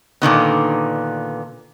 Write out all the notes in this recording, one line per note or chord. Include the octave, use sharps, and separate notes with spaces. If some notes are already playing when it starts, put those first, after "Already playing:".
A#2 D3 D#3 B3